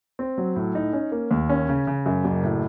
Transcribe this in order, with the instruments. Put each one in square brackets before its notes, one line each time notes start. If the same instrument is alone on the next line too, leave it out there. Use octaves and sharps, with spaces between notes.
[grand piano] C4
F#3
A2
D#4
C#4
A#3
D#2
C#4
C#3
C#3
F#2
F#1
A2